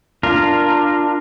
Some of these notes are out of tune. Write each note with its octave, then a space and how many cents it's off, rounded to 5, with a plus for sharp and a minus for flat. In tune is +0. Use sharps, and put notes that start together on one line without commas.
D4 +10 F4 -10 A#4 +0